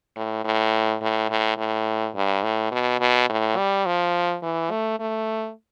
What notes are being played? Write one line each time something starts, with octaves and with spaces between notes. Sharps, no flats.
A2
A2
A2
A2
A2
G2
A2
B2
B2
A2
G3
F3
E3
A3
A3